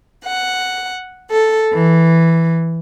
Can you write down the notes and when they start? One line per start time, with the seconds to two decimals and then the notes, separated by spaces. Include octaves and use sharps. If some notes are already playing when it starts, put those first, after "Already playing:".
0.25 F#5
1.31 A4
1.72 E3